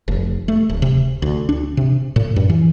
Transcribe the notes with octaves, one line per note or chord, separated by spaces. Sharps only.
F1
A3
D1
C3
D2
D4
C3
A2
F#2
E3